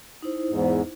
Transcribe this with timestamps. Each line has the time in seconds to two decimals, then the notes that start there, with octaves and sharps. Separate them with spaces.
0.23 D#4 E4 C5
0.50 E2 G#2